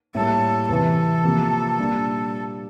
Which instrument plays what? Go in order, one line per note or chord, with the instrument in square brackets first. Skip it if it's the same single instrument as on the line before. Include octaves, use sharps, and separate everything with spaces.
[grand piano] A2 G3 A#3 [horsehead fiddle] A4
[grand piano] E2 C3 E3 [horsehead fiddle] A4
[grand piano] C3 F3 A#3
A#2 G3 A#3 D4